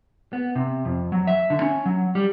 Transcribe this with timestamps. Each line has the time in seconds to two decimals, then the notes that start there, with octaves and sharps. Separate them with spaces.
0.33 B3
0.56 C3
0.85 F2
1.12 F#3
1.27 E5
1.50 D3
1.62 C#4
1.86 F#3
2.15 G3